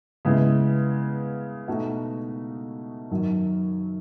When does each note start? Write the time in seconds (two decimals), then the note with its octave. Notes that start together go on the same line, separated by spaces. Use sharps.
0.25 C#3 G#3 B3 E4
1.68 B2 A3 D#4 F#4
3.11 F#2 D#3 F#3